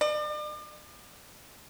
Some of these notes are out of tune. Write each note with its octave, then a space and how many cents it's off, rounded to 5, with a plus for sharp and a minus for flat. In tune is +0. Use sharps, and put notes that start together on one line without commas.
D5 +40